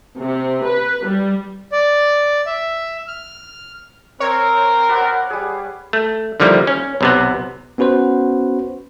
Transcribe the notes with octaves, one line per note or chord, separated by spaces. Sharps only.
C3
B4
G3
D5
E5
F6
C4 A#4 C#5
B4 D5 F#5
G3 G#4
A3
D3 D#3 F3 G3 A#3 E4
C#4
B1 C3 B3
B3 C#4 F#4 B4 C5